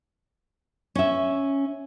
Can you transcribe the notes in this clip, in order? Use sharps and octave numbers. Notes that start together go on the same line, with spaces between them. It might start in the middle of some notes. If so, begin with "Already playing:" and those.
C#4 E5